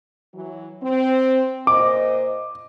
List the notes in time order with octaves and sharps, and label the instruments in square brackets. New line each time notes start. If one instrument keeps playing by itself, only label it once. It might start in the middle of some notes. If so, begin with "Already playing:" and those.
[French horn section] E3 F#3
C4
[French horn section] A#2 C5 D#5 [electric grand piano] D6